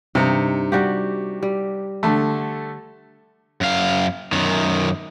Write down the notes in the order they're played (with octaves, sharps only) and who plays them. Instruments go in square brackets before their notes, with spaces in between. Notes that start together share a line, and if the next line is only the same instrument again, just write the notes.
[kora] G2 D#4 [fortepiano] C3
[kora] G3 F#4 G4
G3
[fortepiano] D3 A3
[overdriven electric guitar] F#2 F5
F#2 D#3